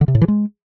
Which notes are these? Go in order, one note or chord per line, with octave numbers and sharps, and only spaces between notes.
D3
C3
A2
E3
G#3